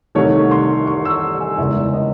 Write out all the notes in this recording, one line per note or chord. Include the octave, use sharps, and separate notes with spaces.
C2 C3 D#3 A3 C#5
C6
C#6
E6
G#5
F#1 E2 C#3 G#3 E5
D#5